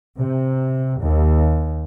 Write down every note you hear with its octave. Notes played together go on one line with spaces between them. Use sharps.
C3
D#2